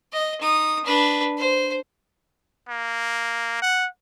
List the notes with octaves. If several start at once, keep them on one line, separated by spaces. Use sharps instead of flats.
D#5
D#4 D#6
D4 B4
C5
A#3
F#5